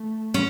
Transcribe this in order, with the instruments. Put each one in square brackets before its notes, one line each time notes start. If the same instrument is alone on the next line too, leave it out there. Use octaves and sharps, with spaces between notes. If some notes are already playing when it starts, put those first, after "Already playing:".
Already playing: [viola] A3
[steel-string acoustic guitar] C#4